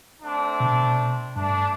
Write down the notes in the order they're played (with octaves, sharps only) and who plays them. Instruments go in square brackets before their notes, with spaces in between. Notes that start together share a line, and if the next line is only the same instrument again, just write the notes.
[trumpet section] A3 C4 D4
[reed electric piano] B2
[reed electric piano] G2 [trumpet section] A3 D4